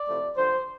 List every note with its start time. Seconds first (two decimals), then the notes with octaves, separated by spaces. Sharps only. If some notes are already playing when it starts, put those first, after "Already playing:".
Already playing: D5
0.09 C3 F3 A3 E4
0.37 G2 D3 F3 C5